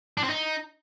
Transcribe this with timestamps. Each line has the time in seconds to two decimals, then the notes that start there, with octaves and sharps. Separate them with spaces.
0.17 D4
0.23 C4
0.29 D#4